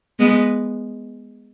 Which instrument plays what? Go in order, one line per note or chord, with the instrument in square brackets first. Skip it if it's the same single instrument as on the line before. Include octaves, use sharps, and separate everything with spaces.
[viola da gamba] G#3 B3